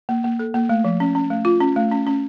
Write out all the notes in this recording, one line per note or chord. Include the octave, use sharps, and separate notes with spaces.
A#3
A#3
A4
A#3
A3
F3
C#4
C#4
A3
F4
C#4
A3
C#4
C#4